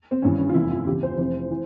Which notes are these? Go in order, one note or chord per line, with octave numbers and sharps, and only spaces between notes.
C4
G#1 G2 E3 C#4
C#4
F4
F1 E2 E3 E4
F4
E2 C#3 E3 G4
C5
F1 F2 E3 C5
E3